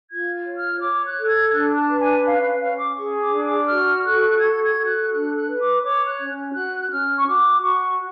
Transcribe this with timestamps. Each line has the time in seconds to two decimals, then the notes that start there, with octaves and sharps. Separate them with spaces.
0.09 F4 G#6
0.45 C#5
0.57 F6
0.80 C#5 D6
1.05 F#6
1.17 A4
1.28 G#6
1.52 D4 F#6
1.76 A5
1.88 B4
2.00 G#5
2.24 C#4 F5
2.42 F5
2.60 C#4 F5
2.78 D6
2.96 G#4 C#6
3.20 D6
3.31 D4
3.44 D6
3.68 F#4 F6
4.03 A4 F#6
4.39 F#4 G#6
4.63 G#6
4.75 A4
4.87 F#6
5.11 D4 F#6
5.35 F#6
5.47 B4
5.59 D6
5.82 C#5 D6
6.06 F#6
6.19 C#4
6.54 F#4 F#6
6.90 C#4 F6
7.16 C#6
7.26 F#4 D6
7.62 F#4 C#6